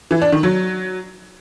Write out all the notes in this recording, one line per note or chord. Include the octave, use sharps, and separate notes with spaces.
E3
D4
D#3
F#3